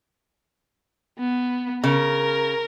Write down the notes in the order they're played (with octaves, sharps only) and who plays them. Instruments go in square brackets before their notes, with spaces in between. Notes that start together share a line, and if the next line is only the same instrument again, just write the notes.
[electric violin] B3
[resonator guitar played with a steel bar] C#3 [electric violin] A#4